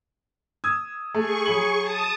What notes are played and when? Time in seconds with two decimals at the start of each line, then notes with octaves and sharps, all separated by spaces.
0.64 D#6 E6 G#6
1.14 A3 G#4 C#6
1.46 F#3 B5 F#7
1.81 A5 D#6